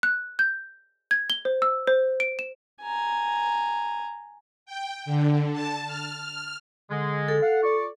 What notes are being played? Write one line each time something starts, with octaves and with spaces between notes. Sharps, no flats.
F#6
G6
G#6
G7
C5
E6
C5
D7
E7
G#5 A#5
G5
D3
A5
F6
F6
D3 G#3
A4
F5 F#5
F4 D5 C#6